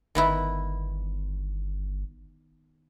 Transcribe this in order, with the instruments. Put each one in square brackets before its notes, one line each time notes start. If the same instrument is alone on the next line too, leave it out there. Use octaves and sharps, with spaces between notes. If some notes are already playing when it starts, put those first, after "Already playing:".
[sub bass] G1 [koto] D#3 B3 E4